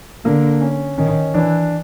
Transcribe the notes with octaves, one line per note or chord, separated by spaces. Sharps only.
D3 A#3
C#4
D#3 C#4
E3 D4